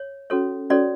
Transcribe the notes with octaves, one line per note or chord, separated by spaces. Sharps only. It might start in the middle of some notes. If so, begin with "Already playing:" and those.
Already playing: C#5
C#4 F#4 A4 C#5
C#4 F#4 A4 C#5 D5